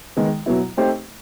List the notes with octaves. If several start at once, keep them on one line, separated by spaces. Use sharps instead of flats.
D#3 G#3 B3
B2 F#3 B3 E4
A3 C4 D#4 G4 C5